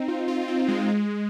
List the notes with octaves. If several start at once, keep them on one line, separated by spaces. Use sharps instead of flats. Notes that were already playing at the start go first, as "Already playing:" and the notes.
Already playing: C4 D#4
F4
F4
C4
G#3
G#3